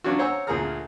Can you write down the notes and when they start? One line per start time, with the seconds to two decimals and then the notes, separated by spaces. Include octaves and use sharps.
0.04 F#3 C#4 D4 F4 F#4
0.19 C5 C#5 F#5 G#5 A#5 E6
0.47 D2 A#2 G#4 A#4 A#5 F6